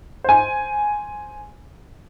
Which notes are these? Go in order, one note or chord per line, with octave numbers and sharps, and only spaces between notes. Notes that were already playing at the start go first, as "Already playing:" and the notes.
C5 G#5